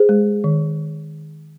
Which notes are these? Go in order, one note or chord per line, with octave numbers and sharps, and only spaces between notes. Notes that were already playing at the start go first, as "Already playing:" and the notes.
Already playing: G#4 C5
G#3
D#3